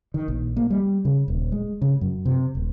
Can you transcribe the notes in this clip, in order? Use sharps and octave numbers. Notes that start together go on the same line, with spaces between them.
D#3
A#1
A#3
G3
C#3
D#1
G#3
C#3
F#2
C3
D#1